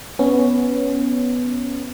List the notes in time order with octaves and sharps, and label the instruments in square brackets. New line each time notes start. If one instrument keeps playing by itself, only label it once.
[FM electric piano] B3 C#4